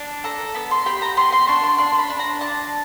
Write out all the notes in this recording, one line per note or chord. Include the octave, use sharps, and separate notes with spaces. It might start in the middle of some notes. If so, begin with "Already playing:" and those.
Already playing: D4
A4 A#5
B3 B5
C6
G4 B5
A#5
B3 C6
C6
D4 C#6
C6
D4 C6
B5
D4
A#5
D4 A5